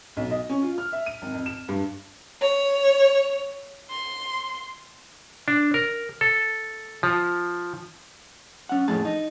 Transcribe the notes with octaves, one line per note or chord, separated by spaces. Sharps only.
B1
D#5
C#4
F4
F6
E5
D#7
G#1
F2
E7
G2
C#5
C6
D4
A#4
A4
F3
C#4 F#5
F2 A2 A3 G#4 A5
D#4